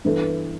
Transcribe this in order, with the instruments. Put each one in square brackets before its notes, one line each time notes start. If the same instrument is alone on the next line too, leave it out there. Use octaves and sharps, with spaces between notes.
[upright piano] G2 E3 B3 E4 A4